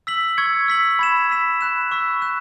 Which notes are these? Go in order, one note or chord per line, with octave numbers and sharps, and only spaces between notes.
E6 B6 F#7
C#6 E6 G#6 C#7
E6 B6 F#7
B5 G#6 E7
E6 B6 E7
B5 F#6 E7
C#6 E6 B6
F#6 E7